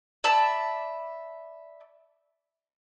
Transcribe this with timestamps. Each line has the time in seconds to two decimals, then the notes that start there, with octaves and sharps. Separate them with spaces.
0.24 D5 E5 A5 B5